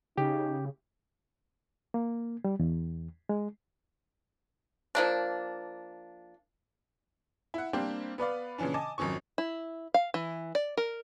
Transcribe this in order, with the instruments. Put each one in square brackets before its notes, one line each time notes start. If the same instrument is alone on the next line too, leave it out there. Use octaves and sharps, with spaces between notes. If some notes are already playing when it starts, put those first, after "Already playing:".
[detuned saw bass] C#3 [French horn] D#4 [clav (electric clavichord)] G4
[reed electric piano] A#3
G3
E2
G#3
[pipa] F3 A#3 D4
[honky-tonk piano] E4 F#5
G3 A#3 C4 D4 G4 C5
B3 B4 D5 F5
A#2 C#3 E3 C#4 D4
D#5 G#5 A5 D6
G#1 F2 F#3 C#4 C#6
[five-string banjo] E4
F5
E3
D5
A#4